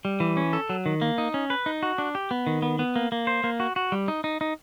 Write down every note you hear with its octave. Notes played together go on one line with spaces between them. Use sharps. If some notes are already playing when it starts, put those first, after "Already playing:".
G3
E3
C#4
A4
F#3
D#3
A#3
D#4
C#4
B4
D#4
F#4
D4
G4
B3
D#3
B3
B3
A#3
A#3
C5
A#3
F#4
F#4
G3
D#4
D#4
D#4